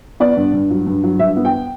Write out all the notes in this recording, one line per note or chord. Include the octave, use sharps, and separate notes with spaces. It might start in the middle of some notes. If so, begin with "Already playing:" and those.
B3 D5
G2
G2
F#3
G2
F#3
G2 E5
B3
G5